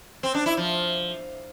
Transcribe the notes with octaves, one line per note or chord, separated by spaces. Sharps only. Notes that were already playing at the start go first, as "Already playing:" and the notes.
C4
D4
E4
F3